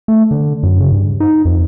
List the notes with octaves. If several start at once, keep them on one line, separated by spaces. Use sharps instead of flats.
A3
D3
F#2
C#3
G2
D#4
F2